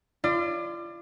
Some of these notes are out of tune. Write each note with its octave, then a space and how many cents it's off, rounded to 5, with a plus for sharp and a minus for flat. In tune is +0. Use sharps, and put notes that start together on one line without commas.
F4 -35 D5 +25